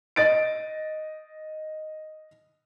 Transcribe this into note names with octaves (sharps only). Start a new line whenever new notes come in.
D#5 A6 D7